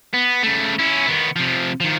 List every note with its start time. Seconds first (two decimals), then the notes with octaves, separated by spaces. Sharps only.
0.14 B3
0.43 C#3 A3
0.79 C#4 E4
1.08 D#3 B3
1.36 C3 F3
1.80 D#3 F3